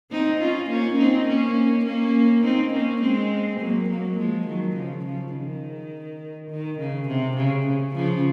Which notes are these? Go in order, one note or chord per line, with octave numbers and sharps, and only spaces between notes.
C4 D#4
C#4 F4
A#3 C#4
C4 D#4
A#3 C#4
A#3 C#4
C4 D#4
A#3 C#4
G#3 C4
F#3 A#3
F#3 A#3
F3 G#3
D#3 F#3
C#3 F3
C#3 F3
D#3
D#3
C#3
C3
C#3
C#3
C#3 F3